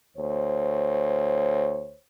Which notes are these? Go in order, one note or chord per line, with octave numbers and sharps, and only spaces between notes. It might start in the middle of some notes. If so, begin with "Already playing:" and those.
D2 C5 C#5